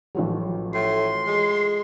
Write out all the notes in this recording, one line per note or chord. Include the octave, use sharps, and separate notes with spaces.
A1 F3 F#3
A2 C6
G#3